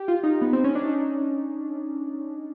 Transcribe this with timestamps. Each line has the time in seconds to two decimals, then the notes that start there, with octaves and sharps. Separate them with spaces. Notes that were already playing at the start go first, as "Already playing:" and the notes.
Already playing: G4
0.08 F4
0.23 D#4
0.42 B3
0.53 C4
0.64 C#4
0.75 D4
0.86 D#4